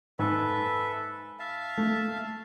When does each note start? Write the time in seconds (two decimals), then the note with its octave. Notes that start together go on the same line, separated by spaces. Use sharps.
0.19 G#2 A4 B4 E5
1.39 E5 F5 A5
1.78 A3